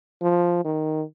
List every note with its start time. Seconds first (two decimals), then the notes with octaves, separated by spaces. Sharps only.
0.22 F3
0.65 D#3